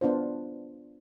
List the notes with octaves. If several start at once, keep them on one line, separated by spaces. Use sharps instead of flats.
B3 D4 F4 C5